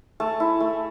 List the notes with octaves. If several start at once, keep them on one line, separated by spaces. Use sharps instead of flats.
A3 A5
E4
A3